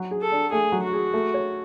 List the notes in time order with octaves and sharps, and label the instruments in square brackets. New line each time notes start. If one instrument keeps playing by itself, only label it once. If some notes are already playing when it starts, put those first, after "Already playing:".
Already playing: [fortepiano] F#3
G#4
[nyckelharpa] A4
[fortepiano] D4
[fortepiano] A3 [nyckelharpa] G#4
[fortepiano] F#3
[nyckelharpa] F#4
[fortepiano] G#4
A3
C#5